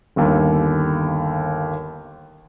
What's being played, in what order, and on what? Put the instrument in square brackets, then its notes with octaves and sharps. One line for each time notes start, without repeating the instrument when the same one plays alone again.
[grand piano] G1 D#2